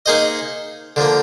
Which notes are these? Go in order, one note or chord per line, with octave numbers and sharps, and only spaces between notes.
A#3 D#4 G#4 C5 D#5
D3 F3 A#3